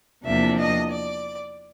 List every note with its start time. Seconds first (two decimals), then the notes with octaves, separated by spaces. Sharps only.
0.25 E2 C3 F3 A#3 D4 E5
0.59 D#5
0.91 D5